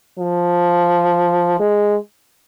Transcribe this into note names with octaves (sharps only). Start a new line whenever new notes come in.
F3
G#3